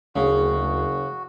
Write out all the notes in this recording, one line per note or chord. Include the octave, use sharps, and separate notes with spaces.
F#1 D2 C#3 F#4